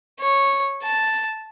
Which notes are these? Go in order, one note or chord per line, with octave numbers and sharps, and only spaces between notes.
C#5
A5